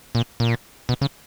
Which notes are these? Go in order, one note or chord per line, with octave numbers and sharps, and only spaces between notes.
A#2
A#2
B2
C#3